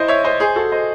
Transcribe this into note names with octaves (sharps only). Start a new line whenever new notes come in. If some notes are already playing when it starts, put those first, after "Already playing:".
Already playing: E4 C5 D#5
C#5 E5
C5 D#5
G#4 C5
F#4 A4
C5 D#5